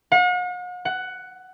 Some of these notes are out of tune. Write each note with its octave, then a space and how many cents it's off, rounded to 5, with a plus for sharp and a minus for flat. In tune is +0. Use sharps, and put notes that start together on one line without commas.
F#5 -45
F#5 +10